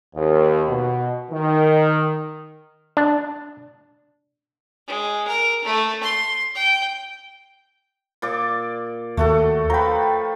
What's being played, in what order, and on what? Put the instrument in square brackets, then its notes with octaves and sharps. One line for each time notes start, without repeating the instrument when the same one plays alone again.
[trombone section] D#2
B2
D#3
[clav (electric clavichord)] D4
[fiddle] G#3
A#4
A3
C6
G5
[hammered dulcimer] A#2 D5 D6
[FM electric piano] D#2 [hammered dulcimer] A3 F#4 A4
[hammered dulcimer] F3 B4 [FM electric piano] G5 A#5